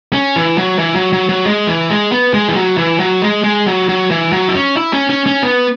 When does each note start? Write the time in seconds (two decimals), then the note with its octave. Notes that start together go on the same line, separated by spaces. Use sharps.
0.13 C#4
0.36 E3
0.58 F#3
0.79 E3
0.96 F#3
1.13 F#3
1.29 F#3
1.45 G#3
1.67 E3
1.90 G#3
2.12 B3
2.34 G#3
2.48 E3
2.55 F#3
2.78 E3
3.00 F#3
3.22 G#3
3.44 G#3
3.66 F#3
3.89 F#3
4.11 E3
4.32 F#3
4.48 E4
4.55 C#4
4.77 E4
4.93 C#4
5.10 C#4
5.26 C#4
5.43 B3